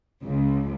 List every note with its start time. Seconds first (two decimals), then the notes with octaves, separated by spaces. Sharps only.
0.24 C#2